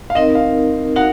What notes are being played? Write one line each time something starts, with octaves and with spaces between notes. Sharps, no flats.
F5
C4 D#4 A#4 D#5
F5
D#4 F#4 A#4 F5 F#5